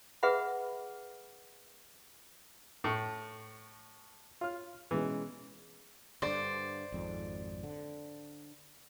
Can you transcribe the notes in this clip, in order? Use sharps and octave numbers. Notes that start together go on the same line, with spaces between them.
G#4 B4 E5 F#5 B5
A2 C#6
F4 C#5 F6
B2 E3 G#3 C#4
G2 D3 C5 D5
G#1 F2 G#2
D3